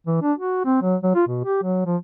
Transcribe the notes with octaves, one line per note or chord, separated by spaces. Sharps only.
E3
D4
F#4
C4
F#3
F#3
F4
B2
G4
F#3
F3